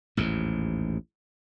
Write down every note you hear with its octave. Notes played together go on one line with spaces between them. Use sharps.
A1 D#2 G#2